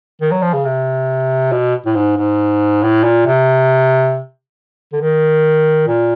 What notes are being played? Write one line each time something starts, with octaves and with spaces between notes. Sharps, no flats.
D#3
F#3
F3
C#3
C3
B2
A2
G#2
G#2
A2
A#2
C3
D3
D#3
A#2